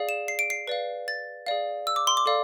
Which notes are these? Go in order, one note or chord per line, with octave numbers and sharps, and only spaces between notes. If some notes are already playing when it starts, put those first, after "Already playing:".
Already playing: G#4 D5 F5
E7
C7
D7
C7
B4 D5 F5
A6
G#4 D5 F5
E6
D6
C6
D6
A4 D5 F5